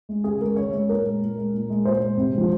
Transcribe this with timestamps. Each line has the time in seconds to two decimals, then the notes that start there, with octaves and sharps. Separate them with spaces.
0.09 G#3
0.24 C#3 G#4
0.40 G#3 A#4
0.56 C#3 C#5
0.73 G#3 C#5
0.88 A#2 A#4
1.06 G#3
1.21 A#2
1.37 G#3
1.53 A#2
1.70 G#3
1.85 A#2 C5
2.02 G#3
2.17 C3
2.33 F3 G#3